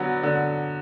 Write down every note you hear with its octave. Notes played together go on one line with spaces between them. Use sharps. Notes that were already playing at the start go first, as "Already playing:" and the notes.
Already playing: D3 F#3 B3
D3